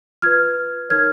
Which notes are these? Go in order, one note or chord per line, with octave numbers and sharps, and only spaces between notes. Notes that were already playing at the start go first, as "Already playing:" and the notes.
F4 B4 F6 G#6
D#4 A#4 C#5 F6 G#6